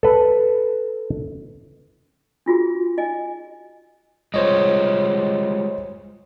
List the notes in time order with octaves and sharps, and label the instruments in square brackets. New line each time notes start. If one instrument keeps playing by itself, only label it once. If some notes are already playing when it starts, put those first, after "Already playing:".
[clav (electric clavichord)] A4 B4
[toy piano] D4 F4 F#4 G#4
D#4 D#5 G#5
[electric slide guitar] G3 G#3 F4 [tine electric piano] C5 C#5 D#5